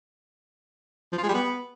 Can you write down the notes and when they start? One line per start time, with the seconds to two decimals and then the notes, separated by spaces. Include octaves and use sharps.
1.12 F3
1.18 F4
1.23 G#3
1.29 G3
1.34 B3